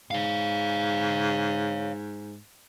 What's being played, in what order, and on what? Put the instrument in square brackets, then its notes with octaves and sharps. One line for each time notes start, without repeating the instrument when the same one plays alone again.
[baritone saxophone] G#2 [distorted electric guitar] C#5 F5